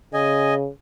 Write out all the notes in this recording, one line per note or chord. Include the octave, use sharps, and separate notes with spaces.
C#3 D#5 G#5